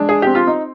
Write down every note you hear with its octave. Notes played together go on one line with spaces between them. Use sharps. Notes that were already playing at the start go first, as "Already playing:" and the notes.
Already playing: G#3 D4
G#4
C4 G4
F4
D#4